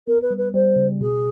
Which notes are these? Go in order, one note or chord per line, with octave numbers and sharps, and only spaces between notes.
B3 A#4
B4
G3
B4
G3 C5
C#3
B2 G#4